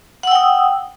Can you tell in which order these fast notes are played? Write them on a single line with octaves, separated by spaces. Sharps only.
F#5 E6 G5 D#6